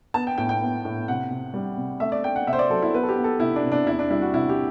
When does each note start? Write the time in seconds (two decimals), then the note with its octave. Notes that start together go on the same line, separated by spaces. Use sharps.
0.14 B3 A5
0.27 G5
0.38 A2 G5
0.49 G5
0.62 B3
0.85 A2
1.08 C3 F#5
1.30 C3
1.54 G3
1.77 C3
2.00 A3 E5
2.12 D5
2.24 A3 G5
2.36 F#5
2.47 C3 E5
2.53 C5
2.59 D5
2.70 F#3 A4
2.82 E4
2.94 B3 B4
3.03 A4
3.09 G4
3.16 B3
3.24 A4
3.40 C3 E4
3.56 D4
3.64 C3
3.72 D4
3.86 E2 E4
3.99 D4
4.10 G3 E4
4.22 F#4
4.34 C3 E4
4.49 G4